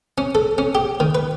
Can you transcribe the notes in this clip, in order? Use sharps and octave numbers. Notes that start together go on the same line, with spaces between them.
C#4
A4
C#4
G4
D#3
B4